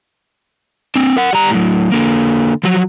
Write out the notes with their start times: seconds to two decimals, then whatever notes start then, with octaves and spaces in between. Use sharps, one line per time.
0.96 C4 D4
1.17 A#4 F#5
1.33 G3 A#5
1.50 A2 F#3
1.92 D3 A#3
2.64 F3 F#3